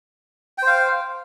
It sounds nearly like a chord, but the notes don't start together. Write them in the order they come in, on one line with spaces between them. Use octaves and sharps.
G5 C5 F5